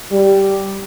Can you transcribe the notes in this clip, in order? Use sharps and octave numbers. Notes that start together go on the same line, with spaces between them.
G3